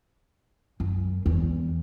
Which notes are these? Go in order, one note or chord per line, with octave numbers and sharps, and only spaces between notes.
F#2
E2